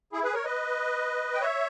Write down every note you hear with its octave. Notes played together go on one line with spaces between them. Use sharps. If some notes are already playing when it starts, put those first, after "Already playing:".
E4 G#4
G#4 B4
A#4 C#5
B4 D#5
G5
C#5 E5